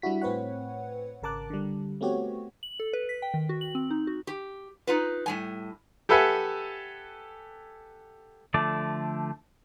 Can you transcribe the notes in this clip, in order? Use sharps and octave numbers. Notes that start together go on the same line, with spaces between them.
G3 D4 E4 F#4 B6
A2 C4 B4 C#5 F#5
G#1 C#3 A#4 A5 D6 F#6
D3 G3
A3 B3 C4 F#4 G4 C#5
F#7
A4
B4
B6
G5
D#3
F#4
F#7
C4
D#4
F#4
G4
D#4 F4 B4
A2 G3 G#5
G4 A4 B4 E5 F#5 G#5
D3 F3 A3 D5